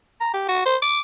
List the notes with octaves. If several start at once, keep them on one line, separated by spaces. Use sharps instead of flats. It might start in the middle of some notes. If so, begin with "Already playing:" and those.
A#5
G4
F#4
C5
D6